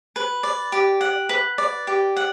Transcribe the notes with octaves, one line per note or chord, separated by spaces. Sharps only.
B4
D5
G4
F#5
B4
D5
G4
F#5